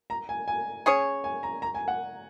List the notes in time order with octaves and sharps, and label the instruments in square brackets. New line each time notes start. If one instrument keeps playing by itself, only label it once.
[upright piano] A#5
G#5
G#5
[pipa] C#4 G#4 C#5
[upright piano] G#5
A#5
A#5
G#5
F#5